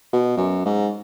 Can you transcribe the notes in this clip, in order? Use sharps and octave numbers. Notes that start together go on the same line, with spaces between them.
B2
F#2
G#2